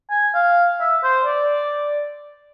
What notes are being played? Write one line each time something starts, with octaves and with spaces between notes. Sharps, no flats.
G#5
F5
E5
C5
D5